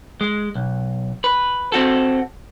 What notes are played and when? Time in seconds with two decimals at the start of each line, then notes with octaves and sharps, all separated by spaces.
0.21 G#3
0.55 B1
1.24 B4
1.72 C4 F#4 A4